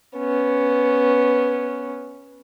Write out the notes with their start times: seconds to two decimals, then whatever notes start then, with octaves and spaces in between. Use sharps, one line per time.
0.17 B3 C#4